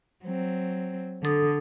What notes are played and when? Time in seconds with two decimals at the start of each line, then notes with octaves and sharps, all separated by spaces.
0.25 F#3 C4
1.25 D3 A4 D#6